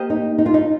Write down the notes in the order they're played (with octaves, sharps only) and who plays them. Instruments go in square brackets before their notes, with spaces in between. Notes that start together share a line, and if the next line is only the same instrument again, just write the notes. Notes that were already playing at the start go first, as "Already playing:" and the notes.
Already playing: [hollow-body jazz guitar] A#3 G4 C5 D#5
[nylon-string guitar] D#4
D#4
F4
D#4